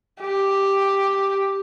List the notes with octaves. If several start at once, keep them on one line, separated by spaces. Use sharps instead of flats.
G4